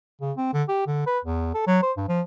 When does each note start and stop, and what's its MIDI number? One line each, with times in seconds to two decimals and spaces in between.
0.21 0.32 49
0.37 0.53 60
0.53 0.63 50
0.69 0.87 67
0.87 1.04 50
1.06 1.19 71
1.25 1.51 40
1.54 1.63 69
1.67 1.80 54
1.83 1.92 72
1.97 2.05 43
2.09 2.21 53